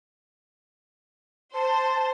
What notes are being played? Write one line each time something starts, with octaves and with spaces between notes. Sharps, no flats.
C5 A5